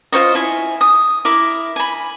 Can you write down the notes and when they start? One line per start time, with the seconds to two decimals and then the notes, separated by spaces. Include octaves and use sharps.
0.12 F4 C5 C#5 D#5
0.35 E4 G#5
0.81 D#6
1.25 E4 A#4 D6
1.76 G#5 B5